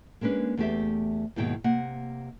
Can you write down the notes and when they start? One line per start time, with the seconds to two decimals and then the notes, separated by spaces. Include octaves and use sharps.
0.21 G#3 A#3 C#4 D4 B4
0.57 E2 A3 G4 E5
1.36 D#2 G#2 B2 D#3 E4 G5
1.64 C3 A#3 F#5